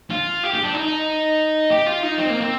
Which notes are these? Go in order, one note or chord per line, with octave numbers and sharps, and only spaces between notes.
F4
G4
G4
D4
D#4
G4
F4
D#4
C4
A#3
C4